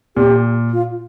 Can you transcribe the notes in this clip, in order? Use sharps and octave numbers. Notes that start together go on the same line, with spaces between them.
A#2 G4
F4